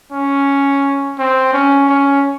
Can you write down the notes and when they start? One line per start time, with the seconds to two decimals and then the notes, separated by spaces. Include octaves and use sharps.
0.12 C#4
1.18 C4
1.53 C#4
1.89 C#4